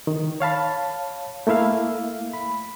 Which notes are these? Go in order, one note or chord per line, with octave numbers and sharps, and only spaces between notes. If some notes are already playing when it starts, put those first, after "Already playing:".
D#3
C#5 F5 A5 B5
A3 A#3 E4 E5 F5
B5